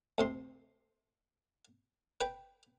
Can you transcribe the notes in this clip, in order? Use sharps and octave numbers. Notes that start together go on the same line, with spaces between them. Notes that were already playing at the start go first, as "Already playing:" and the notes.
D2 C3 C6
B4 G5